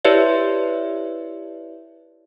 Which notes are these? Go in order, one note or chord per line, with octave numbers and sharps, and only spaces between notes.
E4 G4 B4 C#5 D5 E5